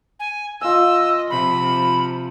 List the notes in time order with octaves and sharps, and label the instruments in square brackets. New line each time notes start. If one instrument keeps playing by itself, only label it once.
[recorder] G#5
[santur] F4 G#5 [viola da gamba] D#5 [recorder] E6
[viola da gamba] C3 F3 [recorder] B5